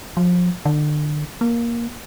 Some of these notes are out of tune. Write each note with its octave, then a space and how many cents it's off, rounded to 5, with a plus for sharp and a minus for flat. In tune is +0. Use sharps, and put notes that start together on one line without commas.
F3 +30
D3 +35
A#3 +10